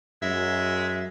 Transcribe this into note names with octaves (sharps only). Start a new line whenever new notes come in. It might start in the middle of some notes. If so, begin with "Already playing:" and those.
F#2 G#3 E5